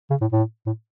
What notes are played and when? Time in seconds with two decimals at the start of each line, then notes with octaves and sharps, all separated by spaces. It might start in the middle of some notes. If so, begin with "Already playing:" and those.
0.10 C#3
0.21 A2
0.32 A2
0.66 A2